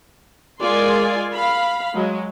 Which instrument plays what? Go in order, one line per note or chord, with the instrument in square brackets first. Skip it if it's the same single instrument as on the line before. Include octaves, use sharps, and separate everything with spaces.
[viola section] G#3 F4 A#4 D5 G#5 C6
F5 B5
F#3 G#3